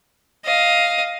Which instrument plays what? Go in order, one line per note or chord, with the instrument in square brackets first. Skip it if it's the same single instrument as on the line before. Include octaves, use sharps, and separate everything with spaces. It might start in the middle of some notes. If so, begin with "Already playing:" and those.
[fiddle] D#5 F5